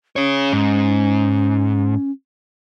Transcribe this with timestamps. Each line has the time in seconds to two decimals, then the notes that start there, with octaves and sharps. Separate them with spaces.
0.16 C#4 G#4 C#5
0.53 G#2